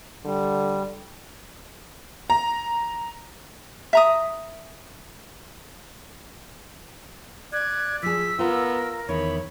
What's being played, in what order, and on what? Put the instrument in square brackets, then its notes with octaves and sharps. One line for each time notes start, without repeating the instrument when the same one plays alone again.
[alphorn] D3 [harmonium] G3
[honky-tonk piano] A#5
[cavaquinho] E5 A#5 D#6
[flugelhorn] D5 [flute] F#6 [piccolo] G#6
[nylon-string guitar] F3 G#4 [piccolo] E6 [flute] B6
[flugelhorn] B3 [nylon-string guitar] F4 [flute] A#4
[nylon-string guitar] E2 D#3 [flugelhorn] C#5 [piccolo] B5